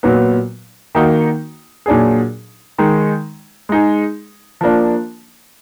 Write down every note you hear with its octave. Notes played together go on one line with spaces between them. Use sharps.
A#2 F#3 B3
D#3 A#3 D#4 F#4
A#2 F#3 D4 G#4
D#3 G#3 D#4
G#3 D#4 G#4
F3 A#3 D4